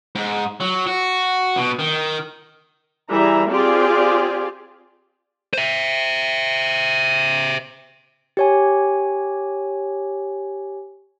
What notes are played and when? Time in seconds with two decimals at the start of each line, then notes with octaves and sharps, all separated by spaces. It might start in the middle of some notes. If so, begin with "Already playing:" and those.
0.15 G#2
0.60 F#3
0.87 F#4
1.57 B2
1.79 D#3
3.11 E3 G3 G#4 E5 A#5
3.50 C4 F4 G4 G#4 D5
5.54 C5 E5
8.37 G4 C#5 G#5